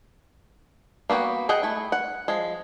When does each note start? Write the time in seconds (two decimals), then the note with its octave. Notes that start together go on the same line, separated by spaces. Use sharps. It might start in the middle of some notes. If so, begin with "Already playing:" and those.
1.10 A#3 B3 F#4 G5
1.49 G#4 D#5 F#5 G5
1.63 A3 E4
1.92 F#5
2.28 F3 G#3